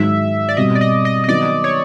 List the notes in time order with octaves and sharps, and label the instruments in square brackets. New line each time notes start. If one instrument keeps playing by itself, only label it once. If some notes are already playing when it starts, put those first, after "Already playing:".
Already playing: [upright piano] G#2 D#3 F#3 [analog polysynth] E5
[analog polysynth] D5
[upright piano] B2 G3 C4 [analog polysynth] D#5
[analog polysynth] D5
D#5
D#5
D#5
[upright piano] D#3 F#3 B3 [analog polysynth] D5
[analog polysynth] C#5